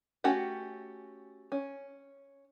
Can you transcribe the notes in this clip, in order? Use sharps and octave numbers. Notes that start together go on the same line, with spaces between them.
A3 C#4 F#4 G4 F#5
C#4